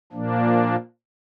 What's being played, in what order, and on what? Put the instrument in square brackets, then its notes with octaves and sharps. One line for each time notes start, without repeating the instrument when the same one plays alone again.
[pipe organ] A#2 F3 A#3 D4